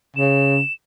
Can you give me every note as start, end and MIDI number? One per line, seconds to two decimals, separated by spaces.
0.16 0.60 49
0.16 0.73 100